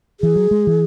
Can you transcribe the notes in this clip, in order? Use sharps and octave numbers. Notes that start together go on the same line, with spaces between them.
E3 G#4
F#3
G#3
E3